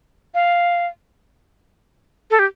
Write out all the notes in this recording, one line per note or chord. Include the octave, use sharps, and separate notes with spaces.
F5
A4
G4